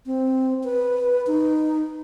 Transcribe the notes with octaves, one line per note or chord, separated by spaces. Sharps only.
C4
B4
D#4